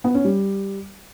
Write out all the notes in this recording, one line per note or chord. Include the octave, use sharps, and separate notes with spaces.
B3
C#4
G3